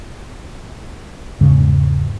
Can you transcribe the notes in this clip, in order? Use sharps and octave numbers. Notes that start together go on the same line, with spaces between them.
E2 G#2 C#3 G#3